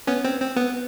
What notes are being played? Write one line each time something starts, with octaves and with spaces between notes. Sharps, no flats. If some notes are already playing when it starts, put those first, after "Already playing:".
B3 C#4
C4
C4
B3